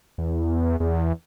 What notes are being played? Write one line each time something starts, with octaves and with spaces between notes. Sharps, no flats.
E2
E2